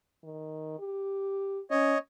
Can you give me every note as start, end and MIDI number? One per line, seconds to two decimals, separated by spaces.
0.24 0.78 51
0.79 1.61 67
1.71 1.95 61
1.71 1.98 73
1.71 1.98 75